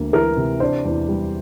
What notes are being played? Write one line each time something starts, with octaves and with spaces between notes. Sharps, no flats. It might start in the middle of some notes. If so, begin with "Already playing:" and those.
Already playing: D2 A#3
E3 A#4
C3
D4 C5
E2
G3